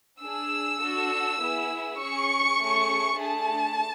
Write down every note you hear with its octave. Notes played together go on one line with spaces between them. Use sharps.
D4 G#4 E6
D4 F#4 A4
B3 E4 G#4
C#4 G#4 C#6
A3 C#4 G#4
A3 D4 G#4 A5